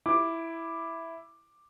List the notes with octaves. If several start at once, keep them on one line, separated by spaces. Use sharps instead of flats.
E4 D6